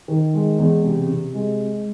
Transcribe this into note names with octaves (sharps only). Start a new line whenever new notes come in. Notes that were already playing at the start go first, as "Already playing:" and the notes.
D#3
G#3
E2
C3
C3
G#3